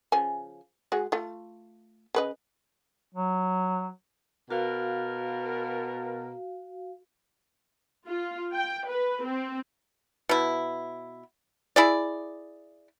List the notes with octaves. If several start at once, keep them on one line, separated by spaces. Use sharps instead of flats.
C#3 F3 G#5
G#3 F#4 G#4
A3 F4
C#3 B4 D#5
F#3
B2 B3 F#4 A#4 F5
F4
G5
B4
C4
B2 E4
E4 G#4 D5